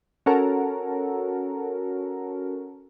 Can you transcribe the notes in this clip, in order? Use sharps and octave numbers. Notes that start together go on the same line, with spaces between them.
C#4 F#4 A4 A#4